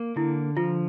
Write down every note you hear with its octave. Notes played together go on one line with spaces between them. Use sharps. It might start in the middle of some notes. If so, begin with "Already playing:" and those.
Already playing: A#3
D3 E4
F3 F4